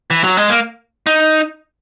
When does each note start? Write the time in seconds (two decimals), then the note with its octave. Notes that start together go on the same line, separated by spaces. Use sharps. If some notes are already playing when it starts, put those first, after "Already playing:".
0.11 E3
0.24 F#3
0.37 G#3
0.50 A#3
1.07 D#4